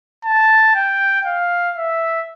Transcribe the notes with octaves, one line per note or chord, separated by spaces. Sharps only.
A5
G5
F5
E5